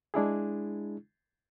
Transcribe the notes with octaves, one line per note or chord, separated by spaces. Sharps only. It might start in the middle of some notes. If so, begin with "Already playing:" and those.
G#3 D4 E4 G#4